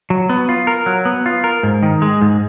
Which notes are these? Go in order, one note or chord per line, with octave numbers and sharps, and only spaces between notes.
F#3
B3
F4
A#4
F#3
B3
F4
A#4
G#2
D#3
G#3
G#2